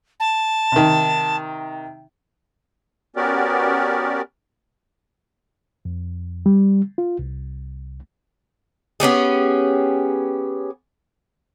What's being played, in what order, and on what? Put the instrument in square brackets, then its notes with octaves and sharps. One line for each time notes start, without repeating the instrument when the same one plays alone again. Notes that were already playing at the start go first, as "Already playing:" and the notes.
[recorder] A5
[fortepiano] C3 D#3
[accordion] B3 C#4 F#4 G4 A#4 D5
[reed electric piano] F2
G3
F4
C2
[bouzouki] B3 C#4 G4 G#4